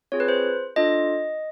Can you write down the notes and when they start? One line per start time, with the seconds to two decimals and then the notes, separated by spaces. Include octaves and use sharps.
0.12 C4 F4 G#4 C#5
0.20 B4
0.28 C5
0.76 D4 F4 A4 D#5